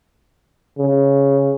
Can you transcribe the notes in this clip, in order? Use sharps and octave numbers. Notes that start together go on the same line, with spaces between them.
C#3